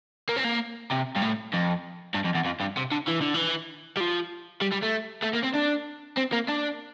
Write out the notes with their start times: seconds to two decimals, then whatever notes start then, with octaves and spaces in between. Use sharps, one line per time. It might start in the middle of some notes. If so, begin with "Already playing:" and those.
0.29 A#3
0.37 C4
0.44 A#3
0.91 C3
1.16 G2
1.22 A2
1.53 F2
2.15 G2
2.25 F2
2.35 E2
2.46 F2
2.61 G2
2.77 C3
2.91 D3
3.08 E3
3.21 D3
3.34 E3
3.97 G3
4.00 F3
4.62 G3
4.72 G3
4.83 A3
5.24 A3
5.35 A#3
5.44 C4
5.55 D4
6.17 C4
6.32 A#3
6.48 D4